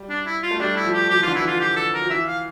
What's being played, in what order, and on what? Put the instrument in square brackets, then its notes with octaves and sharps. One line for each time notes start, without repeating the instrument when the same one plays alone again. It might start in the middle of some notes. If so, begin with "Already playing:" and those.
Already playing: [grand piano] G3
[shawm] D4
E4
F4
[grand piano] A3
[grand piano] G3 [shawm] D4
[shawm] E4
[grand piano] F3
[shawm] G4
[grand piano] F3 [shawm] G4
[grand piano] E3 [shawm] F4
[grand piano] D3
[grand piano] E3 [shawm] E4
[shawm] F4
G4
A4
A#4
[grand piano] F3
[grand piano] E3 [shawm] E5
[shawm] F5